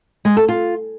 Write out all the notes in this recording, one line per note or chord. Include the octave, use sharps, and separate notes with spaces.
G#3
A4
F4